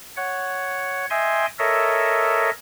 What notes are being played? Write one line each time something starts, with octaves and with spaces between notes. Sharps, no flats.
C#5 F#5
D#5 E5 G5 G#5 C6
A4 A#4 C#5 D#5 E5